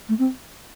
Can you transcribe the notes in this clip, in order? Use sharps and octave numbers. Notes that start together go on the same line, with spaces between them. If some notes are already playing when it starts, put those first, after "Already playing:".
A3
C4